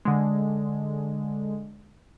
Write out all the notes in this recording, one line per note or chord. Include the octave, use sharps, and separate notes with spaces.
D3 G#3